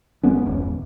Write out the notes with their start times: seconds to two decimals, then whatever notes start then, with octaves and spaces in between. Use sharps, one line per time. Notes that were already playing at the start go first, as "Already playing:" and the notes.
0.23 G1 G#3 B3 C#4
0.46 D1 G1 E2